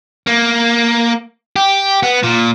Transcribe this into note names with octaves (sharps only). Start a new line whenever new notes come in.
A#3
G4
B3
A#2